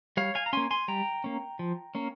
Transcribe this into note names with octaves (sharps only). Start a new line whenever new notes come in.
G3 C#5 F5
F5 G#5
A#5
A#3 C#4 G#5 C6
G#5 C6
G3 G5 A#5
A#3 C#4
F3
A#3 C#4